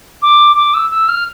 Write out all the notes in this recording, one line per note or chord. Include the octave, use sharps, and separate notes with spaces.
D6
D6
E6
E6
F6